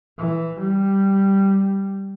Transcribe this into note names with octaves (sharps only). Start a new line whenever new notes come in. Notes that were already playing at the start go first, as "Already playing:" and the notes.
E3
G3